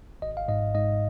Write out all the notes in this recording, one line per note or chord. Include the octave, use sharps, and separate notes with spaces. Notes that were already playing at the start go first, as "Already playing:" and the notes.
G#1 D#5
F5
G#2 D#5
G#2 D#5